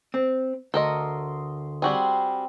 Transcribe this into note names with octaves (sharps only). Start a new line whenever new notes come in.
C4
D2 A4 A#4 D#5 C6 D#6
G3 C4 F#4 G#4 B5 C6